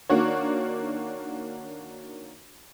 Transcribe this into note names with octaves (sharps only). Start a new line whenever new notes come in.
D#3 A#3 D4 F#4 C#5